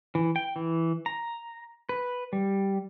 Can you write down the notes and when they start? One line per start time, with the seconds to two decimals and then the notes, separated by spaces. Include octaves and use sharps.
0.15 E3
0.36 G5
0.56 E3
1.06 A#5
1.89 B4
2.33 G3